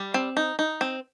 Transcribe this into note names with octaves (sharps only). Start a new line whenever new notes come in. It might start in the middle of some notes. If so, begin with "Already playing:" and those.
Already playing: G3
C4
D#4
D#4
C4